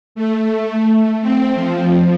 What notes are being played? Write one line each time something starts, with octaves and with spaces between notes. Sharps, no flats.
A3
C4
F3